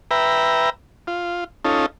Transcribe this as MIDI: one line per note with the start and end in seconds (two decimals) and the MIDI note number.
0.11 0.70 71
0.11 0.70 76
0.11 0.70 79
0.11 0.70 82
1.07 1.44 65
1.65 1.86 61
1.65 1.86 63
1.65 1.86 65
1.65 1.86 69